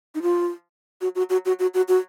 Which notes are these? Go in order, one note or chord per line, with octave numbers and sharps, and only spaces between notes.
D#4
F4
F#4
F#4
F#4
F#4
F#4
F#4
F#4